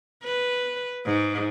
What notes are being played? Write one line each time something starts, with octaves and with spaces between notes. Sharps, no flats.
B4
G#2